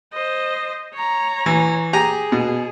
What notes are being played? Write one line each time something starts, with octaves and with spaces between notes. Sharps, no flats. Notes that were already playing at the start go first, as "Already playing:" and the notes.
C5 D#5
C#5 A#5
E3
G4 G#4 G#5 A#5
B2